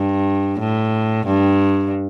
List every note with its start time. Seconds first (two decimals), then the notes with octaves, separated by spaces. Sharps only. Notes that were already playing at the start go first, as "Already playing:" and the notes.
Already playing: G2
0.60 A2
1.27 G2